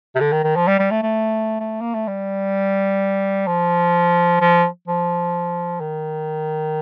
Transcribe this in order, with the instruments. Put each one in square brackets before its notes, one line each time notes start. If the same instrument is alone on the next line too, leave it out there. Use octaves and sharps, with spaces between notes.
[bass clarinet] C3
D3
D#3
D#3
F3
G3
G3
A3
A3
A3
A#3
A3
G3
F3
F3
F3
D#3